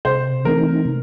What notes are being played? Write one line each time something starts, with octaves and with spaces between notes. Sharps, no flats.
C3 C5
E3 A3 C4 D#4 A#4
C3